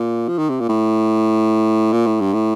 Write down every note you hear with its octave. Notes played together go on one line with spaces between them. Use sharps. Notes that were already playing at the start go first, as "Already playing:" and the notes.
Already playing: A#2
F3
D#3
C3
A#2
A2
A#2
A2
G2
A2